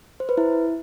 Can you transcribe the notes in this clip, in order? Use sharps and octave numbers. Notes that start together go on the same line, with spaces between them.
C5
B4
E4